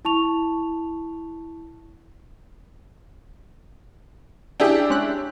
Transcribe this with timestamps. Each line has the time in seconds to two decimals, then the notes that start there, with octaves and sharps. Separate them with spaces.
0.05 E4 A5 C#6 F7
4.60 D4 E4 G4 G#4 G5
4.90 G#3 C#4 F#6